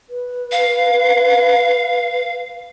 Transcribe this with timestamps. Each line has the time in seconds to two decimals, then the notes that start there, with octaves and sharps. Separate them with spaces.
0.10 B4
0.52 F5